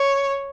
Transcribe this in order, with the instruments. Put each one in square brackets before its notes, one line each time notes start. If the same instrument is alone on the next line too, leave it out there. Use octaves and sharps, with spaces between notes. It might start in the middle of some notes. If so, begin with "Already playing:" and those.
Already playing: [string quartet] C#5